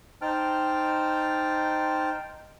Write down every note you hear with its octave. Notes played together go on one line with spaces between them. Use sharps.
D#4 C5 G5 A5 F6